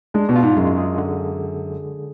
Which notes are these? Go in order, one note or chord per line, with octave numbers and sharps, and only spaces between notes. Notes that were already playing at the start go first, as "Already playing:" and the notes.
G#3 D4
B2
F4
G#2
F#2 G#3
G#4
D3